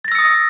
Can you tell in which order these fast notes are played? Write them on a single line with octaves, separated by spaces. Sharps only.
A6 A#6 E6 C#7 D#6